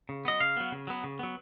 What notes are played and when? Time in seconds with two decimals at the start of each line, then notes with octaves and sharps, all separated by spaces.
0.09 C#3
0.25 F#3 B3 D#5
0.40 C#3 F5
0.57 F#3 B3
0.72 C#3
0.87 F#3 B3
1.04 C#3
1.19 F#3 B3